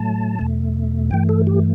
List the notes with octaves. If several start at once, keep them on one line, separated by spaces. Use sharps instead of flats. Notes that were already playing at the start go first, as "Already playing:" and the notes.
Already playing: A2 F#3 A3 A5
E2 B2 A3
G2 E3 A3 G5
A4
G4